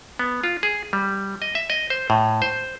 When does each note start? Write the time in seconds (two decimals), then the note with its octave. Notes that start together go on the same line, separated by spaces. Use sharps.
0.19 B3
0.44 F4
0.63 G#4
0.93 G3
1.42 D#5
1.55 E5
1.70 D#5
1.90 C5
2.10 A2
2.42 C5